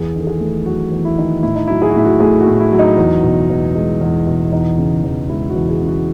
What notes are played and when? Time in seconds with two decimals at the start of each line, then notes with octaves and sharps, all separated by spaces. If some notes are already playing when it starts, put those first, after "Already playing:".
Already playing: E2 G#4
0.15 D#3 A4
0.27 G#4
0.40 A3
0.66 F#3 F#4
0.92 E2
1.05 E4
1.18 D#3
1.43 A2 E4
1.55 D#4
1.67 F#3 E4
1.82 G#4
1.89 F#4
1.95 A2 E4
2.05 F#4
2.20 A3 G#4
2.40 F#4
2.47 A2
2.60 E4
2.73 F#3
2.79 D#4
2.97 E2
3.23 B2
3.50 E2
3.75 G#3
4.01 E2
4.27 B2
4.52 E2 D#4
4.78 C#3
5.04 E2
5.29 G#3 E4
5.49 F#4
5.55 E2
5.69 G#4
5.81 C#3
5.87 F#4